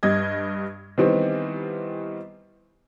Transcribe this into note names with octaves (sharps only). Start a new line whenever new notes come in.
G2 G3 D#5 G#6
D#3 E3 G3 B3 C4